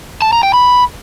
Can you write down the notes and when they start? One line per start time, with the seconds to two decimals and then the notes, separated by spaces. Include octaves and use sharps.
0.22 A5
0.33 A#5
0.43 G5
0.54 B5